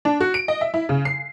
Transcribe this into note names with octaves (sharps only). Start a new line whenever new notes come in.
D4
F#4
D7
D#5
E5
E4
C#3
C7